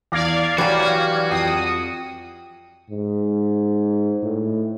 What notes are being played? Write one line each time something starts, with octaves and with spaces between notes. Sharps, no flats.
E2 D5 F5 G#6 A#6
E3 F#3 G3 F#4 F#5
F2 G5 D#6 C7
G#2
A2